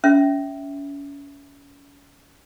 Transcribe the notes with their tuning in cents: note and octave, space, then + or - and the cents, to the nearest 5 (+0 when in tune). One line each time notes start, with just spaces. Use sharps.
C#4 +30 E5 +0